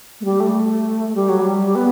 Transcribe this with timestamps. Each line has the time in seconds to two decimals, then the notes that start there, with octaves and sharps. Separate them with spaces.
0.21 A3
0.25 G3
0.40 A3
1.15 G3
1.29 F#3
1.42 G3
1.75 B3